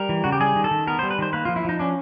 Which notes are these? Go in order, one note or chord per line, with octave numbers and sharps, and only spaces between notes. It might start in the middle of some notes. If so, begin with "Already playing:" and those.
Already playing: G3 A#4
E3
C#3 F#4
G4
G3 G#4
D#3
A4
D#3
B3 A#4
G3 C5
B4
D#3 C5
A#3 B4
F3 F4
E4
F3 D#4
C#4 D4